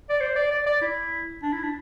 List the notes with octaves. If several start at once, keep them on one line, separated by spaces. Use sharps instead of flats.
D5
C5
D5
D5
D5
E4
D4
E4
D4